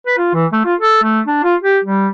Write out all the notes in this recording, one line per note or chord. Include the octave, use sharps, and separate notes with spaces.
B4
F4
E3
A3
F4
A4
A3
D4
F4
G4
G3